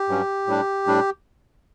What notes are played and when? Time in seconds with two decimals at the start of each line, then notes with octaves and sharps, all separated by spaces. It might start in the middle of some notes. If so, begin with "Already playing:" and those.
Already playing: G4
0.08 G2 F#3 C#4
0.47 A2 G3 D4
0.86 A2 G3 D4